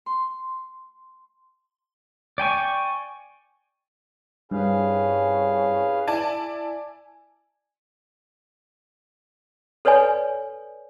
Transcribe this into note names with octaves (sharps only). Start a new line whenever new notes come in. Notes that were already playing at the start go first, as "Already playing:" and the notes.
C6
D5 G5 G#5 C#6
C2 G2 C#4 G#4 B4 F5
E4 D5 G#5 A5
A4 B4 C#5 D5 G#5